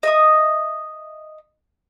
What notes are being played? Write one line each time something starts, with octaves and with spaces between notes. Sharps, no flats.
D#5 E5 D#6